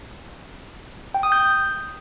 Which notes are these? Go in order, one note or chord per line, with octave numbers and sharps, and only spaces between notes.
G5
D#6
G6